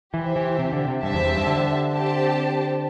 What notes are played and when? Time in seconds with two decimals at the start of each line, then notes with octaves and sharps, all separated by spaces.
0.14 E3 G4 C5 E5
0.36 E3
0.59 C3
0.73 D3
0.88 C3
1.03 G2 G4 C5 E5 A5
1.14 E2
1.25 E2
1.37 G2
1.47 D3
1.92 C4 G4 C5 A5